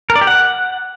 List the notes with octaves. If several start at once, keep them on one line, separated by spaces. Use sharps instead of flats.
A#4
D5
G4
F#5